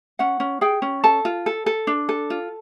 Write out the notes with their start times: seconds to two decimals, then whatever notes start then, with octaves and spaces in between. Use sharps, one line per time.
0.19 C#4 F#5
0.40 C#4
0.61 G#4 G5
0.82 C#4
1.04 A4 A5
1.25 F4
1.46 A4
1.66 A4
1.87 D4
2.09 A4
2.30 F4